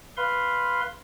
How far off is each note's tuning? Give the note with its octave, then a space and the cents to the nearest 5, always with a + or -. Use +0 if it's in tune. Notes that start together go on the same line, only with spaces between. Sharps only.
B4 +0 F5 +0 C6 +0